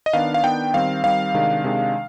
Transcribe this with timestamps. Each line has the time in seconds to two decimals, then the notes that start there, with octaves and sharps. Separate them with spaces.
0.06 D#5
0.13 D#3 B3 D4 F5
0.34 F5
0.43 D#3 B3 D4 G5
0.74 D#3 G3 C4 F5
1.04 D#3 G3 C4 F5
1.34 C3 D#3 G#3 D4
1.64 C3 D#3 G#3 D4